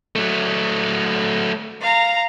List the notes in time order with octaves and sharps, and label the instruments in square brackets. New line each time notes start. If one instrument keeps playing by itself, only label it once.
[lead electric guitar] F#3 A3
[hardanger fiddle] F5 A#5